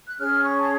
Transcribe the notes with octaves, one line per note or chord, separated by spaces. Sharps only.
F#6
C#4 G#4 C#5 F6
C#6
A5